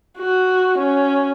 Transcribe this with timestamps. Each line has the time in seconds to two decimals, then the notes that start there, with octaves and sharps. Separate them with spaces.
0.18 F#4
0.78 C#4